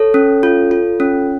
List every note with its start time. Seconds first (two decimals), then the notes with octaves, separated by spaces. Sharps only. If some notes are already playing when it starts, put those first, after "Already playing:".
Already playing: A4 C#5
0.14 C#4
0.43 F4
0.71 F4
1.00 C#4